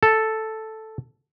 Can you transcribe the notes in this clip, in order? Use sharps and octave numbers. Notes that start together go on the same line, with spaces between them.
A4